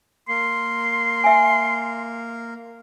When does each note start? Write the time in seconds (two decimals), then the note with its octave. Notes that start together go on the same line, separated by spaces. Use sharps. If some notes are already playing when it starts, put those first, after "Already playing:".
0.29 A#3 C6
1.24 E5 G#5